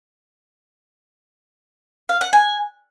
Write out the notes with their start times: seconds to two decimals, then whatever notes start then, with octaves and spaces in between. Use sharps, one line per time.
2.09 F5
2.21 F#5
2.33 G#5